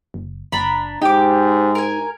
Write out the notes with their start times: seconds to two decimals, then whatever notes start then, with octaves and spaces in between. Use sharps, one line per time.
0.14 F#1
0.52 F#1 D4 A#5 B5
1.02 G#2 D#4 G4 D6
1.75 A#4 G#5